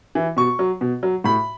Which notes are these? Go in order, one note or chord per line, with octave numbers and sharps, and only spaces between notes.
E3
B2 C#6
F#3
B2
F#3
A2 B5